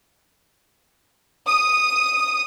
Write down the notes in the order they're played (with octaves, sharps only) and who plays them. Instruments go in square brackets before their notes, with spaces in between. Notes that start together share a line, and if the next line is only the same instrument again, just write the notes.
[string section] D#6